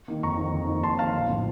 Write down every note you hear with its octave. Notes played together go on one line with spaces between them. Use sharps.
D#3 A#3
F2 A#5 C#6
D#3 A#3
F2
D#3 A#3
F2 A5 C6
D#3 A#3 F5 A5
A#1
A2 F3